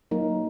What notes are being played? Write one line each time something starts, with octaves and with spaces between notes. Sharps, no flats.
F#3 A#3 D#4 A#4